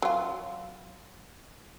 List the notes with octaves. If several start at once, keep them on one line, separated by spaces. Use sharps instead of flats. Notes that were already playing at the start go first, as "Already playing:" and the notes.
F#3 F4